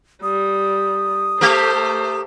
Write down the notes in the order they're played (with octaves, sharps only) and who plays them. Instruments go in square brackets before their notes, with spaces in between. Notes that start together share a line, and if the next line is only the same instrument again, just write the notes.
[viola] G3 [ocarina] D#6
[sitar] A3 G4 A#4 [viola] A4 C5